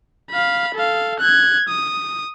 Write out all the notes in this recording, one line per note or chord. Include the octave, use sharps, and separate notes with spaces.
F5 B5
A4 F5
F#6 G#6
D#6